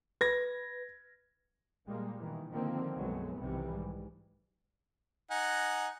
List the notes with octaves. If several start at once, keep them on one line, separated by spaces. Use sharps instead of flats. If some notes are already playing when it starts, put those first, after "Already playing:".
B4 G#6 A#6
A#2 G3 G#3 A#3
B2 D#3 E3
D3 D#3 F3 A#3 C4
B1 F#2 F#3 G#3 A3 B3
B1 C3 D#3 E3 G3
G#2
D#4 F#5 G#5